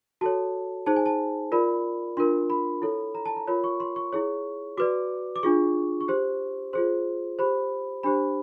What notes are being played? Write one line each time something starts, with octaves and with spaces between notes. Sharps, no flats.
F#4 A4 C#5 A5
D#4 G#4 C5 A5
G#5
A5
F4 A#4 D5 B5
D4 F4 A#4 C6
B5
E4 A4 C#5
A#5
A5
A#5
F4 A#4 C#5 B5
C#6
C6
C#6
E4 G#4 C#5
F#4 B4 D5 D6
D6
D4 F4 G#4 C#6
C#6
G4 C5 C6
F4 G#4 C5 C6
G4 C5 B5
D4 G4 C5 B5